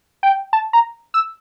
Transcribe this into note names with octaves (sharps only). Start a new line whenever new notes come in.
G5
A5
A#5
E6